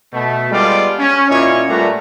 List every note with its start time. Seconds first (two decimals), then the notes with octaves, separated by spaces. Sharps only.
0.13 B2 A3
0.51 G3 G#3 B3 F4 A4 D5
0.99 C#4
1.29 A#2 C#4 E4 C#5 D#5
1.68 A#2 G3 A3 F#4 B4 A#5